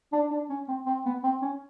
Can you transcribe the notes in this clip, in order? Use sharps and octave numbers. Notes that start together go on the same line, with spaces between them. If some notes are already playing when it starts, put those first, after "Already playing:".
D4
D4
C#4
C4
C4
B3
C4
C#4